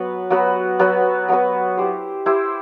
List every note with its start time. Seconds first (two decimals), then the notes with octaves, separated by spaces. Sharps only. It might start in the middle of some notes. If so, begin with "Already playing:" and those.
Already playing: F#3 B3 F#4 B4
0.30 F#3 B3 F#4 B4
0.79 F#3 B3 F#4 B4
1.28 F#3 B3 F#4 B4
1.77 E4 G4 C5
2.26 E4 G4 C5